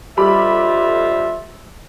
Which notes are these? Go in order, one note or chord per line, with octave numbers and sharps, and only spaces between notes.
F2 D3 G3 F4 E5 B5 D6